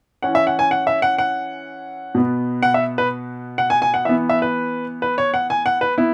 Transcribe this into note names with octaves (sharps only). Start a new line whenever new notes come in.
E3 C#4 F#5
E5
F#5
G#5
F#5
E5
F#5
F#5
B2 B3
F#5
E5
B4
F#5
G#5
G#5
F#5
E3 B3 E5
E5
B4
B4
C#5
F#5
G#5
F#5
B4
B3 E4